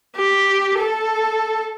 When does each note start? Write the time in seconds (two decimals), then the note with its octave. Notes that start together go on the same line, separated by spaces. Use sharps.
0.16 G4
0.78 A4